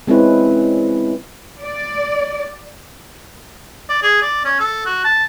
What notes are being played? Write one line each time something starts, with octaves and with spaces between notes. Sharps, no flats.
G#3 C4 C#4 E4 B4
D5
D5
G#4
D5
C#4
A4
F#4
A5